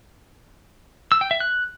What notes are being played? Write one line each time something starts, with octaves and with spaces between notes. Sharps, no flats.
E6
G5
E5
F#6